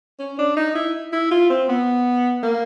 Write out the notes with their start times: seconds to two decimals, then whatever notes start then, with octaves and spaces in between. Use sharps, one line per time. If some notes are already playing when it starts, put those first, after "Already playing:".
0.19 C#4
0.39 D4
0.57 D#4
0.75 E4
1.13 E4
1.31 F4
1.50 C4
1.69 B3
2.43 A#3